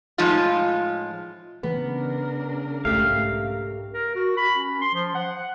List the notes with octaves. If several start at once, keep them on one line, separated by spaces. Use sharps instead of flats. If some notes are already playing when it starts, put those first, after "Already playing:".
A2 F3 G#3 D#4 F4
C#3 E3 B3 D4 A#4
B1 G#2 A3 G4 F5
A#4
F#4
B5
C#4
C6
F3
F#5
F#5